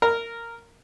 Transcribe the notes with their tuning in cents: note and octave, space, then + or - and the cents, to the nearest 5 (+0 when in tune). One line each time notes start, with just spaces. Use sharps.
A#4 -10